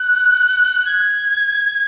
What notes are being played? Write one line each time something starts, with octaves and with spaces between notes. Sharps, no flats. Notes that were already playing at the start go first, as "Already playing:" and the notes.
Already playing: F#6
G#6